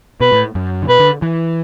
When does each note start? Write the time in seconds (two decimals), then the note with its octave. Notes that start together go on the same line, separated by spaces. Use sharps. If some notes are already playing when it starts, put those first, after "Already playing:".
0.20 B2 B4
0.32 A2
0.55 F#2
0.82 D3
0.88 B2 B4
1.00 D3
1.22 E3